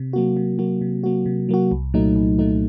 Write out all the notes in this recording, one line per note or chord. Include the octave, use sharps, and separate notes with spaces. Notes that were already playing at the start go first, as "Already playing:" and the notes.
Already playing: C3
F#3 A#3 F#4
C3
F#3 A#3 F#4
C3
F#3 A#3 F#4
C3
F#3 A#3 F#4
C2
A#2 F#3 A3 D#4
C2
A#2 F#3 A3 D#4